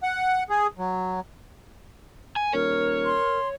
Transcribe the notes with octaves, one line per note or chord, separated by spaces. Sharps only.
F#5
G#4
F#3
G#5
D#1 A#4 C#5
C6